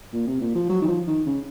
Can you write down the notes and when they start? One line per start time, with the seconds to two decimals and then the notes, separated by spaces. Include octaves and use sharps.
0.13 A#2
0.27 C3
0.41 A#2
0.55 F3
0.69 F#3
0.82 D#3
0.88 F3
1.07 D#3
1.26 C#3